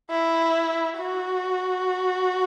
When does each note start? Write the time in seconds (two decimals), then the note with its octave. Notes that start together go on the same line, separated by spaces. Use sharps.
0.11 E4
0.98 F#4